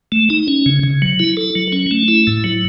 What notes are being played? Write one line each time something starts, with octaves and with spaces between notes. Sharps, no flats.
A3
D#4
C#4
C#3
C#3
F#3
E4
A4
F#3
C#4
A3
E4
A2
F#3